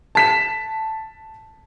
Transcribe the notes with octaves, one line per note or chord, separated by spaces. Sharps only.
A5 B6 E7